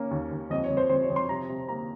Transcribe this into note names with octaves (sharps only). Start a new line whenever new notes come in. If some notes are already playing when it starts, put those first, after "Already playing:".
Already playing: A#3 C#4
D#2
D#2
F2 D#5
C#5
F2
C5
F2 C5
C#5
F2
C6
C3 A#5
C3
A#3 A#5